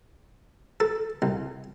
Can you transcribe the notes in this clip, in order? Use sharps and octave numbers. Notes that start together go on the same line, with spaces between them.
A4
C2